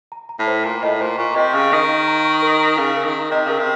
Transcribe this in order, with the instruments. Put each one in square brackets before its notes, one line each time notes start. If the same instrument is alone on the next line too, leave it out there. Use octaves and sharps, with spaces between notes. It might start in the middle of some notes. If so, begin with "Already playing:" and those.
[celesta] A#5
A#5
[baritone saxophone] A2
[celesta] C5
[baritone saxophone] A#2 [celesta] A#5
[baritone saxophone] A2 [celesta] D#5
[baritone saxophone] A#2 [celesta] C5
[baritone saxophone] A#2 [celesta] C#6
[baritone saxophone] C3 [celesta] D#5
[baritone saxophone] C#3 [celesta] C#6
[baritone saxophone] D#3 [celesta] D#5
[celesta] D#5
A#5
C#6
A#4
A#5
[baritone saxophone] C#3 [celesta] A#5
[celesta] A#4
[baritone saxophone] D#3
[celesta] A#5
[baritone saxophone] C3 [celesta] D#5
[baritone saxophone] C#3 [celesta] A#4
[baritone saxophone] C3